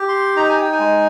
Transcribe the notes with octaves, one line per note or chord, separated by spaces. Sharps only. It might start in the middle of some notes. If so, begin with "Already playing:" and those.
Already playing: G4
C6
D#4 A#5
G#5
G5
G#5
G#3